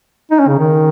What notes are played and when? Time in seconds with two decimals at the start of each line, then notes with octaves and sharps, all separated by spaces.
0.31 D#4
0.39 C#4
0.48 C#3
0.58 D#3